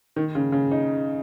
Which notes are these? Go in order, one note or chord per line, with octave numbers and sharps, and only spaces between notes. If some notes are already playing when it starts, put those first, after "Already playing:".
D#3
C#3
C#3
D#4